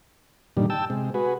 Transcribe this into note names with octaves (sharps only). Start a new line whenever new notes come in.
G2 A#2 D3 D#3 G3
G5 A5 E6
C3 G#3
F#4 G#4 B4